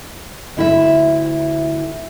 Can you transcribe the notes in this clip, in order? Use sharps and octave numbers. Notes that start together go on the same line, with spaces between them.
D2 E4 E5